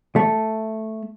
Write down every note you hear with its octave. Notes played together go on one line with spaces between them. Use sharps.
A3